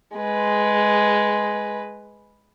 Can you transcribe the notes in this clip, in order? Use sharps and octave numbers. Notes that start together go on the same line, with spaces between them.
G#3 B4